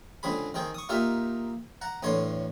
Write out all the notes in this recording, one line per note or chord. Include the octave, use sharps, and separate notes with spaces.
C#2 D3 C4 G#4 B5
D#3 C4 G#4 G5
C#6 D#6
A#3 D#4 F4 G4 E5
F#5 A#5
E2 A2 D3 C#5 C6